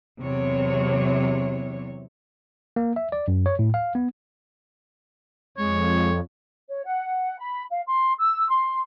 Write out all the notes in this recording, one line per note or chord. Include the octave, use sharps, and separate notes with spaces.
E2 C3 F#3 C#5
A#3
E5
D5
F#2
C#5
A2
F5
B3
F2 G#3 C#5
C#5
F#5
B5
F5
C6
E6
C6